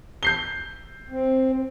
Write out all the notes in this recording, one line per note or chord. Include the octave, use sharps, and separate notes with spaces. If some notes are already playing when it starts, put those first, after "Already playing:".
G6 C7 G7
C4